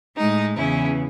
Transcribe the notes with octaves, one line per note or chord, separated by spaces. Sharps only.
A2 G#3 D#4
E2 C#3 E3 C#4 E4